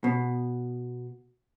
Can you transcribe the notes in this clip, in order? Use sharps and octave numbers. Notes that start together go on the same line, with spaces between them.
B2